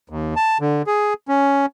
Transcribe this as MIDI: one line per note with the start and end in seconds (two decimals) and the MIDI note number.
0.09 0.34 39
0.36 0.58 81
0.61 0.82 50
0.87 1.14 68
1.28 1.66 61